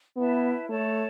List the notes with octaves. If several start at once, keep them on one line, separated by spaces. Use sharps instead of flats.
B3 E4 B4 E5 A5
A3 A4 C#5 A5